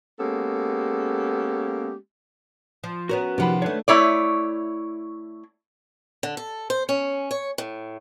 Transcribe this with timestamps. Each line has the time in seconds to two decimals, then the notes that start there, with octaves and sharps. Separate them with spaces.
0.20 G#3 A#3 B3 C#4 G4 A4
2.84 F3
3.09 B3 C#4 F#4 A#4
3.38 C3 D#3 F3 F#5 B5
3.62 A3 D4 B4 C#5
3.88 A3 E4 C#5 D5
6.23 D3
6.37 A4
6.70 C5
6.89 C#4
7.31 C#5
7.58 A2